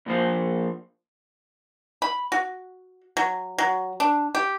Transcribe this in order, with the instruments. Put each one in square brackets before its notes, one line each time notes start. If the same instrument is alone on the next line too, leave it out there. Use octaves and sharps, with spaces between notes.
[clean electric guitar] A#2 F3 C5
[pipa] B5
F#4
F#3
F#3
D4
G4